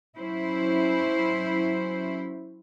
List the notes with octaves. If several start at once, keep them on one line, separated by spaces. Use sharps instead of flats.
F#3 C#4 E4 C5